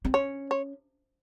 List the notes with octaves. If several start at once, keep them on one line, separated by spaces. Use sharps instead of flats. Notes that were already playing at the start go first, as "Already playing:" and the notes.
C4
C#4 C#5
C#5